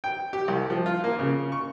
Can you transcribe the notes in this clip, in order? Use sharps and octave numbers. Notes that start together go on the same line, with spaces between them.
G5
G4
C2
F3
F4
A#3
C#3
C#6